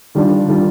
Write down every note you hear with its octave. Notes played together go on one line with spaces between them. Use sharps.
D#3 G3 D4 F4
D#3 G3 D4 F4